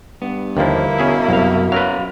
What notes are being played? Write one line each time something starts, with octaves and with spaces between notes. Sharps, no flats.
G2 B3
D#2 D3 F3 A#3 E4
B2 C#4 G#4 E5
C2 F#2 F5
F#2 F#3 F#4 A#4 B4 F5